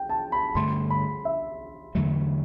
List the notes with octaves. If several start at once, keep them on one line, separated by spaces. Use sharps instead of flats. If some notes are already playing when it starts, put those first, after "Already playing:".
Already playing: G5
A5
B5
G2 D3 A3 C6
B5
E5
E2 D3 F#3 A3